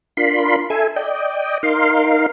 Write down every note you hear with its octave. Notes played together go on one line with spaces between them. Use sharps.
D4 F4 A#4 B5 C6
A4 E5 G#5
D5 D#5 G5
D#4 A#4 F5 C6